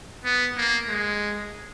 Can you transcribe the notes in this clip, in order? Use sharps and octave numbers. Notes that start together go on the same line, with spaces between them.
B3
A#3
G#3